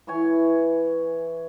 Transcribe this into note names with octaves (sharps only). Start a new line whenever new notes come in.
E3 E4 C#5 G#5